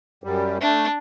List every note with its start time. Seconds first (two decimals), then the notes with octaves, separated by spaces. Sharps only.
0.24 F#2 G3
0.61 A3 D4